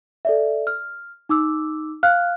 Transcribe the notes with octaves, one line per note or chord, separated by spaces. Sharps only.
A4 D5 E5
F6
D#4 D6 E6
F5 F6 F#6